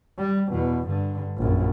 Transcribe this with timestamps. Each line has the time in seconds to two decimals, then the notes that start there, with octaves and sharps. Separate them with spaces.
0.19 G3
0.49 E2 B2
0.87 G2 D3
1.37 A#1 F#2